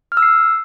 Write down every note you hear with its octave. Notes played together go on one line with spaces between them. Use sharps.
F6
E6
C7